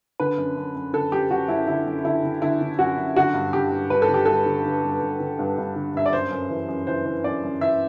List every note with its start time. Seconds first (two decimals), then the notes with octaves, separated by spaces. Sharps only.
0.20 D3 B4
0.37 F#2
0.56 F#2
0.75 F#2
0.93 D3 A4
1.12 F#2 G4
1.31 F#2 F#4
1.48 F#2 E4
1.68 D3 E4
1.86 F#2
2.05 D3 E4
2.23 D3
2.42 D3 E4
2.61 D3
2.79 F#2 F#4
2.97 F#2
3.16 D3 F#4
3.34 G2
3.53 D3 G4
3.71 G2
3.90 G2 B4
4.02 A4
4.09 D3
4.14 G4
4.25 G2 A4
4.46 D3
4.65 D3
4.83 G2
5.01 G2
5.20 D3
5.39 G2
5.58 G2
5.76 D3
5.94 G2 E5
6.06 D5
6.13 F#2 C5
6.31 F#2
6.50 E3
6.68 F#2
6.87 E3 C5
7.06 E3
7.24 F#2 D5
7.43 F#2
7.61 E3 E5